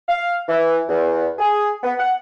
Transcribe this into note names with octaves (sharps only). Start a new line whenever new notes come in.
F5
E3
E2
G#4
B3
F#5